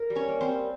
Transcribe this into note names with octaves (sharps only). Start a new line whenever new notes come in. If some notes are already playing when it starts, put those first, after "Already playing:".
Already playing: A#4
G3
C#4 C#5
A#3
C4 C5
G3